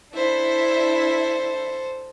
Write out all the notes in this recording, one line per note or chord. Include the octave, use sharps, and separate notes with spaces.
D4 E4 A4 C5 E5